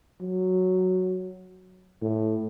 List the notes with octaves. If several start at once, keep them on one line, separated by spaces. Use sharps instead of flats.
F#3
A2